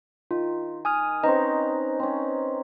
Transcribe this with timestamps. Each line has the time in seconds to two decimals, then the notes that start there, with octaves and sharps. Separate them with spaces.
0.31 D#3 F4
0.85 G#5 D#6 F6
1.23 C4 C#4 D#4 B4 D#5 A#5
2.00 C4 C#4